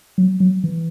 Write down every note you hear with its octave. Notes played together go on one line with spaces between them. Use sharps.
F#3
F#3
E3